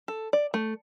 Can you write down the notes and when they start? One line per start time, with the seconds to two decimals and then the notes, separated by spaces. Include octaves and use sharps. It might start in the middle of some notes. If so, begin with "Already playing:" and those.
0.08 A4
0.33 D5
0.54 A3